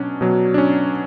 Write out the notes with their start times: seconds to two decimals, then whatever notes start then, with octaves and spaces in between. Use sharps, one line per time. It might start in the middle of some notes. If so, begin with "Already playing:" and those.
Already playing: B2 F#3 C#4 D4
0.21 B2 F#3
0.54 D4
0.58 C#4